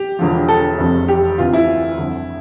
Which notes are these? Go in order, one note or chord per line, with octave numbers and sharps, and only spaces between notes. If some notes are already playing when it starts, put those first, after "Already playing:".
Already playing: G4
E1 E2 D3 F3
A4
F1 F2 C3
G4
D2 C3 E3 F4
E4
G1 F2 D3